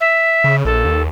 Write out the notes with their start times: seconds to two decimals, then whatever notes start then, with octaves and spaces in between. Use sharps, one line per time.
0.01 E5
0.44 C#3
0.65 A#1 A4
0.85 D#2